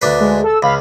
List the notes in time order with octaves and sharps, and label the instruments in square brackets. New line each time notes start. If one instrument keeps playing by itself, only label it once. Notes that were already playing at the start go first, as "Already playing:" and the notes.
[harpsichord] D2 D4 B4
[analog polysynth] G#3
A4 E6
[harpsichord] C#2 [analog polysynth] F5 B5